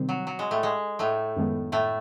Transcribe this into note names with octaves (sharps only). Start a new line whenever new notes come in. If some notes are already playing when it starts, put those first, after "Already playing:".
Already playing: C3 D#3 G3 C4
F#3
F#3
G#3
A2 A3
G#3
A2 A3
F#2 D#3 G#3 B3
A2 A3